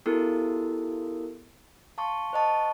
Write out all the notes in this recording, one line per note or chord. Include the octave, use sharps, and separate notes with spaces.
B3 E4 F#4 G4 A4 A#4
F5 A5 C6 C#6
C5 D#5 A5 C#6